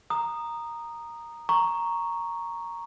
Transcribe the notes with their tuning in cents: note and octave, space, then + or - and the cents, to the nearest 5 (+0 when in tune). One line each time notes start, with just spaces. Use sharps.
A#5 +0 D#6 -15
A#5 +0 C#6 +0